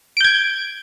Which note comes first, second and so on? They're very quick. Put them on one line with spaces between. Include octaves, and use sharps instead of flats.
D7 G6 G#6